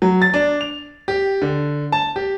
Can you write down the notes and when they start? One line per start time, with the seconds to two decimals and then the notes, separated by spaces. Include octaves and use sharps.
0.02 F#3
0.22 A6
0.34 D4
0.61 F7
1.08 G4
1.42 D3
1.92 A5
2.16 G4